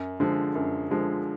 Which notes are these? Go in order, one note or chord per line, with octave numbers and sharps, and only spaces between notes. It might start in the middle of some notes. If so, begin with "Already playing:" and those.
Already playing: F#2
D3 F3 G#3
F#2
D3 F3 G#3